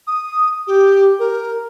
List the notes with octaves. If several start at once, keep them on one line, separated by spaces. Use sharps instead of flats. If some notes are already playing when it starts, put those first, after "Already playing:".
D#6
G4
A#4